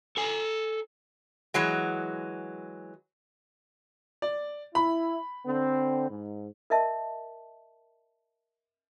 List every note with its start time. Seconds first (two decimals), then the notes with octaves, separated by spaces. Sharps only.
0.17 A4 G#5
1.54 E3 F#3 G#3
4.22 D5
4.75 E4 B5
5.46 D3 C4
6.10 G#2
6.70 A#4 D#5 E5 A5